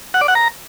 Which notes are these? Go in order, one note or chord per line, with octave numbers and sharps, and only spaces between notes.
F#5
D5
F#5
A#5